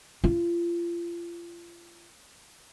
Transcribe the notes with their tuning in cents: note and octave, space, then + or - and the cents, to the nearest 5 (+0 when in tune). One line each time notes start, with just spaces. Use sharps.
F4 -30